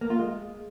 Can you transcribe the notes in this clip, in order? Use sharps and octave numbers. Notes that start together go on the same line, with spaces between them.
A#3
F4
G#3